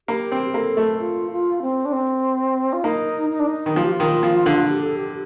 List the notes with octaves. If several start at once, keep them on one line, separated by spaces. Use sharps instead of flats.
A#3 G4
C4
G4
A#3 A4
A3
F4
F4
C4
D4
C4
F4
A#3 D#4
D#4
D4
D#4
D#3
F3 F4
G4
F4
D#3
F3
D3
G4
A4
G4